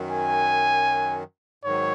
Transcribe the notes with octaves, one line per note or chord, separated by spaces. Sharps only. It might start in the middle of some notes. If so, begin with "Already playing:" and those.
Already playing: F#2 D#3 F#3
G#5
G#2 D#3 F#3 C#5